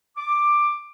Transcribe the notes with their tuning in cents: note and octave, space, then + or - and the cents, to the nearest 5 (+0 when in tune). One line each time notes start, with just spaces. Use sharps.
D6 +10